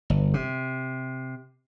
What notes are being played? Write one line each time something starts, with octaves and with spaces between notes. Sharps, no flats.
G1
C3